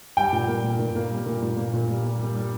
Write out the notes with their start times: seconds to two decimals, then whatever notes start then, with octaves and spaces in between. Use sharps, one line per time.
0.17 G3 G5
0.33 A#2
0.48 A#3
0.64 A#2
0.79 A#2
0.96 A#3
1.11 G3
1.26 A#2
1.42 A#2
1.57 A#3
1.73 A#2
1.89 G3
2.04 A#3
2.20 G3
2.35 G3